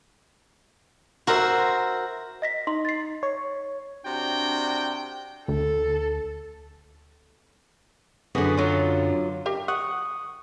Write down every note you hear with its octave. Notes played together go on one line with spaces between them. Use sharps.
F#4 A#4 C5 E5
D#5 A#6 B6
D#4 C6
A6 C7
C#5
C3 D4 F#4 G5
D2 A4
F#2 D3 B3 F#4 G#4
F#3 F4
G4 A#4 F5
F#5 C#6 D#6